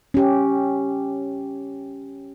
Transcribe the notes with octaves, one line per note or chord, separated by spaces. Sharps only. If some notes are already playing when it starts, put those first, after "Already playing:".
C#4 G4